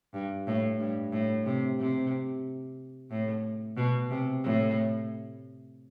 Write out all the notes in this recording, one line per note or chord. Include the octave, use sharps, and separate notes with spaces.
G2
A2
G2
A2
C3
C3
A2
B2
C3
A2